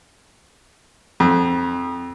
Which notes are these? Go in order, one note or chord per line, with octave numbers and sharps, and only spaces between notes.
F2